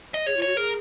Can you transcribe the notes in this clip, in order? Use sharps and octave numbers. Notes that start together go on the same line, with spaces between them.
D#5
G#4 C#5
F4
F#4 C#5
G#4 A#4